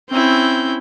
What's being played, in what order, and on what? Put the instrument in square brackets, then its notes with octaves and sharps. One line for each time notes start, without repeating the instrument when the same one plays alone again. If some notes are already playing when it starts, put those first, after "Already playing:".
[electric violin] C4 G6 [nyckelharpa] C#4 E4